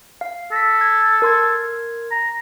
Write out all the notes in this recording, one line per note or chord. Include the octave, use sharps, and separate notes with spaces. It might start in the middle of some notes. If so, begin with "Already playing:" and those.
F5
A4 A#6 B6
G#6
A#4 C6 G#6
A#5